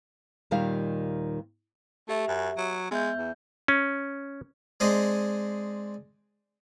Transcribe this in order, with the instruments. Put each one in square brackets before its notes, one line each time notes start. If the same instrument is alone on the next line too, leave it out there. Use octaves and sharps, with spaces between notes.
[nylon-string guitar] D#2 A#2 D#3 G3 F5
[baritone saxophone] A3 [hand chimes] G4 E5
[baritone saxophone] F#2
F#3
[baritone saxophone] G#3 [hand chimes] B3 E5 G6
[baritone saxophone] E2
[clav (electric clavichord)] C#4
[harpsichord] G#3 C4 D4 G#4 D#5